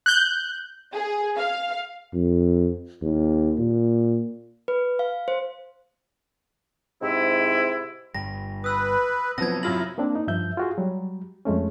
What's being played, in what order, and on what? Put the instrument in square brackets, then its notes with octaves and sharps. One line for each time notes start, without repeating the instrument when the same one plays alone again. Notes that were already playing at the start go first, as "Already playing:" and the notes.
[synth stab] F#6 G6
[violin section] G#4
F5
[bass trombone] F2
D#2
A#2
[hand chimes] B4
F5
C5
[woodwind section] G#2 C3 E4
[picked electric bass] G1 G2 G3 [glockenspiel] A#6
[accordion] B4 [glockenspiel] D#6 E6
[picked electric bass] C3 F#3 [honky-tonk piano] F3 B3 [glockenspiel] G#6 A#6
[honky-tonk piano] F#2 F4 A#6 [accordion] E4 [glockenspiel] F#7
[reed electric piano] A#3 C4 D4
D#4
G2 F3 E5 G6
F4 F#4 G#4
F#3 G3
F2 G#3 A3 C#4